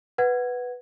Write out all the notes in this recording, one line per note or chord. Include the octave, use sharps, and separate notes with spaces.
B4 F#5 G#6